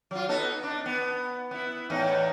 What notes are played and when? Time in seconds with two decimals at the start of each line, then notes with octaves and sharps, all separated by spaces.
0.11 F#3 F4
0.29 B3 D#4 A4
0.63 D4 D#4
0.86 B3
1.51 B3 E4
1.90 E2 A2 D#4